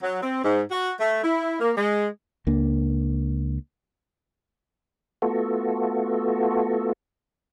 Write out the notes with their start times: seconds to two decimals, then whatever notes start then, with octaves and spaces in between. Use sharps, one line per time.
0.02 F#3
0.22 C4
0.44 G#2
0.71 F#4
1.00 A3
1.24 E4
1.60 A#3
1.76 G#3
2.47 C#2 A#3 D4
5.22 A3 B3 F4 F#4 A4